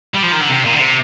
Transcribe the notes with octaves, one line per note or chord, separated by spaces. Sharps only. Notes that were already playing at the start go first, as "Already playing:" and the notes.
G3
F3
D#3
D3
C3
A#2
D3
C3